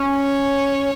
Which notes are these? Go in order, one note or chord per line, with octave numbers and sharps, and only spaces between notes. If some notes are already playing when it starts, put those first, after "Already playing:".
Already playing: C#4
C#5